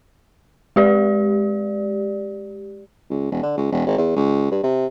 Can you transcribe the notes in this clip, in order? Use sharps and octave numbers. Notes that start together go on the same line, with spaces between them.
G#3 G4 D5
C#2
E1
D3
C#2
E1
G#1
E2
C#2
G2
C3